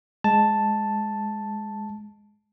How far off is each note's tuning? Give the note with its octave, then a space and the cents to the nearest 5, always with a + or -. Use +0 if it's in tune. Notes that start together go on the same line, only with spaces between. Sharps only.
G#3 +0 A5 +0